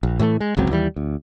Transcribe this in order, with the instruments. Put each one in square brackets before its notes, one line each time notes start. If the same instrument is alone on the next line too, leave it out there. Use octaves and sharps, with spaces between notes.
[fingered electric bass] A#1
A2 E3 G3 A3
G#3
G1 C#2 F#3 C4
D#2 E3 F#3 G3
D2